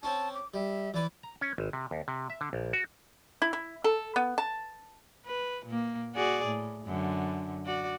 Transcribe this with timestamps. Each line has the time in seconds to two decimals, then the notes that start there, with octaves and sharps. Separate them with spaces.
0.03 C4 C#4 A5
0.34 D6
0.54 G3 E5
0.94 E3 B4 D5
1.23 A#5
1.41 C#4
1.58 G#1
1.73 C3
1.91 D#2
2.08 C3
2.30 E5
2.41 D3
2.53 A#1
2.73 F#4
3.42 E4
3.53 E4
3.84 A4
4.16 B3
4.38 A5
5.26 B4
5.66 A#2 A#3
6.15 F#4 G#4 D5
6.46 A2
6.85 F#2 D3
7.65 F#4 D5